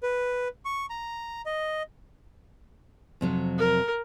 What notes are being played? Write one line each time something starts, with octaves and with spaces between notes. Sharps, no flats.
B4
C#6
A#5
D#5
F2 C3 F#3
A#4